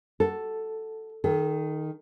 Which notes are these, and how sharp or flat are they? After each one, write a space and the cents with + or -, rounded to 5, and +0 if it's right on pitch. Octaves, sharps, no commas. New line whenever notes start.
F#4 +10 A4 +0
D#3 +0 A4 -40